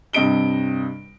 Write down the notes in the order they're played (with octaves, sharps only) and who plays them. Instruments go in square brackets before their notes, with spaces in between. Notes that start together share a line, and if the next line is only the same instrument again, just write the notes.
[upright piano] G2 C3 D#5 D7 G7